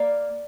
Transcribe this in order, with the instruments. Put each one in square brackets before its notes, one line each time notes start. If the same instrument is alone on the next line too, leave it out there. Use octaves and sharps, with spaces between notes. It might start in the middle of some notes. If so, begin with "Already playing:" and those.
Already playing: [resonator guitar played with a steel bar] A#3 D5